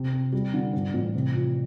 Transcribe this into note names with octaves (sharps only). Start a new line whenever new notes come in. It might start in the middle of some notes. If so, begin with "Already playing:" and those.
Already playing: C3
C4
G3
D3
G2
A1
C3
F3